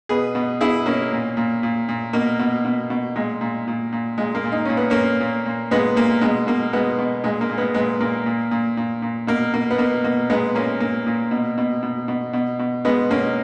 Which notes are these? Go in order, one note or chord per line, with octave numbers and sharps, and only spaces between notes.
B2 G#4 B4
B2
B2 E4 G#4
B2 A#3 C#4
A#2
A#2
A#2
A#2
B2 A#3
B2
B2
B2
A#2 G#3
A#2
A#2
A#2
A#2 G#3
A#3
A#2
D#4
A#2 C#4
B3
A#2 A#3 C#4
A#2
A#2
A#2 G#3 B3
A#2 A#3
B2 G#3
B2 A#3
B2 G#3 B3
B2
A#2 G#3
A#3
A#2
G#3 B3
A#2 G#3 B3
A#2 A#3
A#2
A#2
A#2
A#2
B2 A#3
B2 A#3
B3
B2 A#3
B2 A#3
A#2 G#3 B3
A#2 A#3 C#4
A#2 A#3
A#2
B2
B2
B2
B2
B2
B2
B2 G#3 B3
B2 A#3 C#4